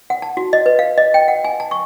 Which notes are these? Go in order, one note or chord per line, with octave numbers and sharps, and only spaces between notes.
F#5
A5
F#4
D#5
B4
F5
D#5
G5
F#5
G#5
A5
C#6